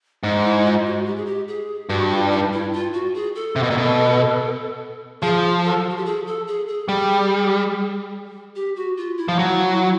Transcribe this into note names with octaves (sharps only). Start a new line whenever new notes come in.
G#2 D#4
E4
F4
F#4
G4
G#4
G4
G#4
G2 F#4
F4
D#4
E4
F4
F#4
G#4
A4
C3
B2
A#2
B2
F3 G#4
A4
F#4
G4
G#4
A4
G#4
G#4
G3
G4
F#4
F4
E4
F3
F#3